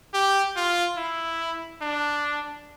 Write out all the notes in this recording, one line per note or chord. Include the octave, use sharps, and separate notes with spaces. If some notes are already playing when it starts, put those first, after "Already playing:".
G4
F4
E4
D4